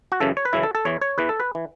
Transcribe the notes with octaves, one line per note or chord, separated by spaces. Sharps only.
F#4
F#2 C#3 E3 A4
C#5
B4
F#2 C#3 E3 E4
A4
A4
E2 E3 C#5
C#5
E2 E3 B4
A4
B4
E3